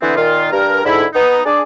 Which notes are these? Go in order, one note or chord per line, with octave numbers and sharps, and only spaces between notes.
D3 E3 B3 C4
A#2 D#3 F4
G2 A#4
G#2 D3 E4
B3 D#4
D4 G#4 D5